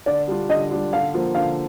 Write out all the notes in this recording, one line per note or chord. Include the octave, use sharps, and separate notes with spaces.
D3 D5
G3 D4 F4
D3 D#5
G3 D4 F4
D3 F5
F3 A#3 F4
D3 F5